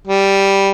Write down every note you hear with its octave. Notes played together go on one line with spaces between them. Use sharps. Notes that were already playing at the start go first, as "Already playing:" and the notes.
G3